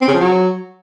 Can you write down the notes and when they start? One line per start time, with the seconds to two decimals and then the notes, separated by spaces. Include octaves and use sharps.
0.01 C4
0.08 C#3
0.14 F3
0.20 F#3